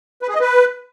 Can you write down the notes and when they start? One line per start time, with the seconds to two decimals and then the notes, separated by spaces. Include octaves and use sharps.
0.22 B4
0.28 G#4
0.34 D#5
0.40 B4